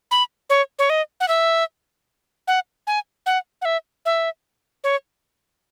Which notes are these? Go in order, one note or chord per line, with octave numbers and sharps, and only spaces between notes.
B5
C#5
C#5
D#5
F#5
E5
F#5
G#5
F#5
F#5
E5
E5
C#5